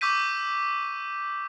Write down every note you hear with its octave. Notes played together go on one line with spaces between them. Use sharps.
C#6 D6 E6 G6 B6 D#7